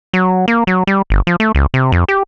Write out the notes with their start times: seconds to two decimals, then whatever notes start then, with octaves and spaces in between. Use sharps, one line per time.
0.13 F#3
0.48 A#3
0.67 F#3
0.87 G3
1.10 G1
1.27 F3
1.40 A3
1.55 C#2
1.74 C3
1.92 F2
2.08 G4